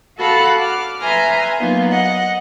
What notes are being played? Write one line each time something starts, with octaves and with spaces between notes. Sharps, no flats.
F#4 A4 F5 F#5 A5 B5
D6 F6
B4 E5 G#5 A#5 C6 F6
F#3 A#3 B3 D#4 F4
D#5 F#5